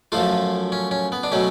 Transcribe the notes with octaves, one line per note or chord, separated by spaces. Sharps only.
F#2 F3 A3 F4
C#4
C#4
B3
D4
B2 F#3 A3 C#4